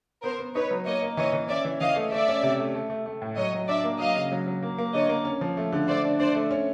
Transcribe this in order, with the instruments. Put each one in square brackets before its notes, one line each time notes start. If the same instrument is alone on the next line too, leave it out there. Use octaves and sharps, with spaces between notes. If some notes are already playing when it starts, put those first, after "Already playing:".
[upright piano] B3 [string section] A#4 C5
[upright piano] B3
[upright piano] D#4 [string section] B4 C#5
[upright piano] F#3
[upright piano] A#3 [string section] C#5 D#5
[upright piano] A#3
[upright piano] E3 [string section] C#5 D#5
[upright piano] E3
[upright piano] C#4 [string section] D5 E5
[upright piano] E3
[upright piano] E3 [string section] D#5 F5
[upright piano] A3
[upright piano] A3 [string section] D5 E5
[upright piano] C#4
C3
A3
A3
A3
A3
A2
[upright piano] F#3 [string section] C#5 D#5
[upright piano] F#3
[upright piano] D4 [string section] D5 E5
[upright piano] A#3
[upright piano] F#3 [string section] D#5 F5
[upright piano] C#3
F#3
F#3
A#3
A#3
[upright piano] D3 [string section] C#5 D#5
[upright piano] A#3
C#4
F3
A3
D3
[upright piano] A3 [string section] C5 D5
[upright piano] D4
[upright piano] D4 [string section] C5 D5
[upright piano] A3
C#4